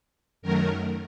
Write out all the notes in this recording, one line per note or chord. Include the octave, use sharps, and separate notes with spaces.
F#2 D#3 F#3 A3 A#4